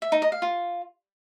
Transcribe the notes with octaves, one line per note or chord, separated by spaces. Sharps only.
E5
D#4
D#5
F5
F4